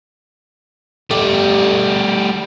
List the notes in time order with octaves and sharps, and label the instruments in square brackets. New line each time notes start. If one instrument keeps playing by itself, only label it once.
[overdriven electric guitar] G3 A3 [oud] G4